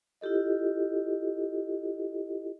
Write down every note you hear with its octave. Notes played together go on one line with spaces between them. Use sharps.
E4 F4 G4 A4 D#5